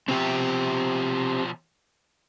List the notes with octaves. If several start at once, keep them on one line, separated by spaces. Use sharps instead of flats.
B2 F3 C4 G4